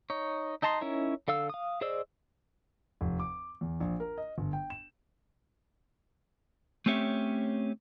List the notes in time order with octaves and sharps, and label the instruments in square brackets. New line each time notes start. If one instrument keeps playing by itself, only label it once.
[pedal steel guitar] D#4 C#5
D#4 D#5 A5 A#5 C6
C#4 D#4 E4 A#4 C#5
D3 A4 F5 E6
F5 D#6
G#4 C5 D5 D#5 E6
[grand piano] F1
D6
E2
A#1
A#4
D#5
G1
G5
E7
[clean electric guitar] A3 C4 C#4 G4 C#5 E5